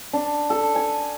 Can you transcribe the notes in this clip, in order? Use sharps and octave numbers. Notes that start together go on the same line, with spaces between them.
D4
A4
G#5